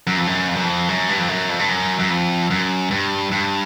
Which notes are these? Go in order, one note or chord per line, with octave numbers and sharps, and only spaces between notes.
F#2
F2
F#2
F2
F#2
F2
F#2
G2
F2
F#2
F2
G2
F#2
F#2
F2
F#2
G2
G2